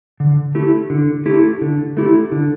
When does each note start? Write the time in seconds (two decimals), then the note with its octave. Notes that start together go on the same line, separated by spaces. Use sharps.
0.20 D3
0.55 A3 E4 G4
0.90 D3
1.26 A3 E4 G4
1.61 D3
1.97 A3 E4 G4
2.32 D3